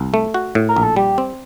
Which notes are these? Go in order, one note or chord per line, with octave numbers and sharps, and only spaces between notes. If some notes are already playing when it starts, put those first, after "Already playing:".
Already playing: C2
A3
F#4
A2
A#4
A#1
A4
G3 G4
C4